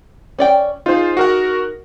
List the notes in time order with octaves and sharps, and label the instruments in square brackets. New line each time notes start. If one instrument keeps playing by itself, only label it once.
[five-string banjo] C#4 D5 G5
[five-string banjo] D#4 G#4 [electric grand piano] F4 C5
[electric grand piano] F#4 A#4 F#5